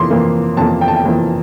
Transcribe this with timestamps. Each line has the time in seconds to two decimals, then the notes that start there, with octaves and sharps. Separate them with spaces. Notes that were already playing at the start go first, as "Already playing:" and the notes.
Already playing: F2 E3 A#3 C6 D6
0.10 F2 E3 A#3
0.57 F2 E3 A#3 A5
0.81 G5
0.88 A5
0.96 G5
1.06 F2 E3 A#3